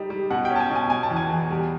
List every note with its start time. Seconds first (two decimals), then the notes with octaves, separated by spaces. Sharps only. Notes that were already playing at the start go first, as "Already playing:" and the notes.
Already playing: G3 D#4
0.10 G3
0.30 B2 F#5
0.45 G5
0.50 C#4
0.56 A5
0.60 G#5
0.70 B2
0.75 G#5
0.90 B2 G#5
1.03 A5
1.10 E2
1.16 G#5
1.30 E2
1.50 G3